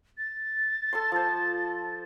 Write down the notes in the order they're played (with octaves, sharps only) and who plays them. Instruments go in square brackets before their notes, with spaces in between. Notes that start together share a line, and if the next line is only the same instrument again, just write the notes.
[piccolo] A6
[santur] A4 A5 C6
F3 C5